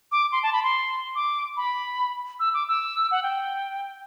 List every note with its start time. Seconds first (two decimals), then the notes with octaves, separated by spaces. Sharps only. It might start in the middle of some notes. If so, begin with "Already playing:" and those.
0.12 D6
0.32 C6
0.43 A5
0.53 B5
0.64 C6
1.15 D6
1.57 B5
2.40 E6
2.54 D6
2.68 E6
3.11 F#5
3.23 G5